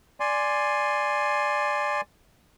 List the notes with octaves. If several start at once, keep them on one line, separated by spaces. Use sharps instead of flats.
D5 G#5 C6